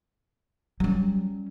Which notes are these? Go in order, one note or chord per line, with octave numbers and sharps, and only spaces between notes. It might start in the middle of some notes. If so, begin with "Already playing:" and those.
F#3 G3 C#4